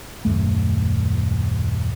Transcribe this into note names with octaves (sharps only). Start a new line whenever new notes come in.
D#1 G#1 F#2 A3